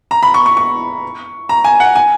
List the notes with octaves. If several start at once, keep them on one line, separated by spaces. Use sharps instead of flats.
A#5
B5
C#6
C#6
C#6
A#5
G#5
F#5
G#5